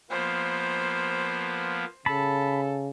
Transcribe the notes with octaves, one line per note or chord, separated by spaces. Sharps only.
F3 A#3 B3 C5
C#3 A4 A5 B5